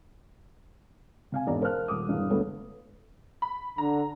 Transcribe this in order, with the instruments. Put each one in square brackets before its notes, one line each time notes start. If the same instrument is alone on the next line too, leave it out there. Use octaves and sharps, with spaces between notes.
[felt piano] C3 F5 G#5
E1 G#2 B2 D5 A#5
A#4 C5 F5 A5 F6 F#6
D#1 D6 D#6
E1 G2 E3 F5
G1 D2 A3 B3 C#5
[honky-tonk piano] B5
[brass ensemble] D3 [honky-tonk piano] A#5